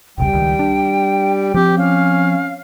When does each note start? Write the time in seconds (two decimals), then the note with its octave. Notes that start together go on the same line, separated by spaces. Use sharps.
0.18 E1 C2 C#3 G3 G5
0.33 C#2 D#3
0.59 D4
1.54 F3 C4 G4
1.77 C#4 F5